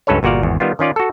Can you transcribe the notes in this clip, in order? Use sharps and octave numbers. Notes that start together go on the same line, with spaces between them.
C#2 G2 C#4 A4 B4 C#5
G1 A#2 F#4 D5 F5
G#1 E2
D#3 G3 B3 F4
D#3 C#4 F4 D5
F#4 A4